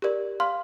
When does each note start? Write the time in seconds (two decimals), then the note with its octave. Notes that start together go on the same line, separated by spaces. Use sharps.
0.02 G4 A#4 D5
0.40 F5 C6 F6